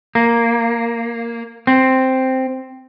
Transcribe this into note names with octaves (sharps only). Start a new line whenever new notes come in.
A#3
C4